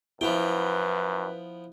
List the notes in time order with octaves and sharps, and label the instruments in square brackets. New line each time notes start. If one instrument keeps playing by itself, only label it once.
[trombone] F#2 [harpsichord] F3 B3 G5 [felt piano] E4 [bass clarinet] B4